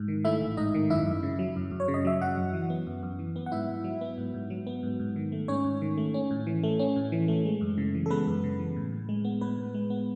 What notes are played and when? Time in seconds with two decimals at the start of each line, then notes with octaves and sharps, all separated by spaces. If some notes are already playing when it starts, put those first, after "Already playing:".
Already playing: G#2
0.08 D#3
0.25 A3 E4 E5
0.41 A1
0.57 G#2 D#4 D#5
0.74 D#3
0.90 F#2 E4 E5
1.06 F#2
1.23 C#3
1.39 F#3
1.56 F#2
1.71 F#2
1.80 C#5
1.88 C#3
1.94 D#5
2.05 F#3 E5
2.21 F#2 F#4 F#5
2.37 F#2
2.53 E3
2.70 B3
2.87 F#2
3.03 F#2
3.19 E3
3.36 B3
3.46 F#5
3.52 G#2 E4 E5
3.69 G#2
3.84 F#3
4.01 B3
4.18 G#2
4.34 G#2
4.50 F#3
4.67 B3
4.83 G#2
5.00 G#2
5.16 D#3
5.32 A3
5.48 G#2 C#4 C#5
5.64 G#2
5.82 D#3
5.97 A3
6.14 C#4
6.31 A2
6.47 E3
6.63 A3
6.79 C#4
6.96 A2
7.12 E3
7.28 A3
7.45 G#3
7.61 F#2
7.78 C#3
7.95 E3
8.06 A4
8.10 G#3 B3 B4
8.27 F#2
8.44 C#3
8.60 E3
8.76 A2
8.92 A2
9.09 G#3
9.25 B3
9.41 A2 B3 B4
9.58 A2
9.74 G#3
9.90 B3